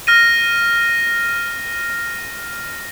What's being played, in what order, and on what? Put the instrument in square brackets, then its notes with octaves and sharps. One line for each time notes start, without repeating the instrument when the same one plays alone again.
[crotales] F6 A#6 D#7